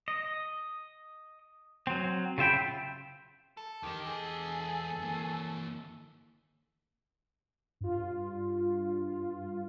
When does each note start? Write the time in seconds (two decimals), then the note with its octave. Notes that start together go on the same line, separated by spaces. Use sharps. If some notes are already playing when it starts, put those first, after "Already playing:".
0.08 D#5
1.87 F#3 C4
2.38 C#3 F4 E5 G5 B5
3.57 A4
3.83 E2 D#3 G4 D#5
4.06 G#4 A4
5.03 E3 A#3
7.81 G2 F4